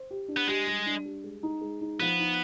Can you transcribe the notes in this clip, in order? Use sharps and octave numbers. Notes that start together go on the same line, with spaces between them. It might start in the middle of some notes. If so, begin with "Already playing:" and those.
Already playing: C5
G4
D4
B3
G#3 G4
G3
D4
G3
G#3
D#4
G#3
D#4
F3 B3
D#4